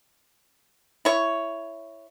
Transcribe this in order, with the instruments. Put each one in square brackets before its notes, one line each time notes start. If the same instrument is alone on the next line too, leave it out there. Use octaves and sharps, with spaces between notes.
[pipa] E4 C#5